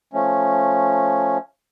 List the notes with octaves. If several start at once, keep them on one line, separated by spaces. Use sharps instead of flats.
F3 A3 C#4